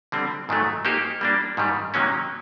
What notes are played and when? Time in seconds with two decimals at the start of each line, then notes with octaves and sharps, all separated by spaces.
0.12 D3 G3 C4
0.49 G#2 D#3 F#3 A3
0.85 A#3 D#4 G4 C5
1.21 G3 A#3 D4
1.57 G#2 D#3 G3
1.94 C3 D#3 F#3 A#3 C#4